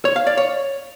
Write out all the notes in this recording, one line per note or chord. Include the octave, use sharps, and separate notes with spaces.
C#5
F5
D5
C#5